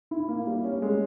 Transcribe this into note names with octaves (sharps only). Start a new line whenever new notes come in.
E4
A#3
G3
C#4
G#3